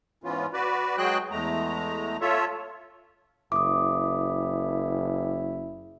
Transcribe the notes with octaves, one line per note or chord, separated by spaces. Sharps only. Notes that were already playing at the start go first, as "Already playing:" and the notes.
G#2 E3 B3 C#4 F4
F#4 B4 D5
F#3 G#3 F#4 G#4 G5 F#6
E2 G#3 A3 A#5
F4 A4 C#5 E5
F#1 E4 D6 D#6